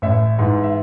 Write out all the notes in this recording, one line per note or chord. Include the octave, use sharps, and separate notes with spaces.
A1 E5
G#2 E3
E5